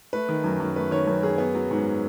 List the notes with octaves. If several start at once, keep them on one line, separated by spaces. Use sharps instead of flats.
A3 B4
D#3
F#2
F#2
A3 B4
D#3 C#5
F#2 B4
F#2 G#4
B3
F#3
G#2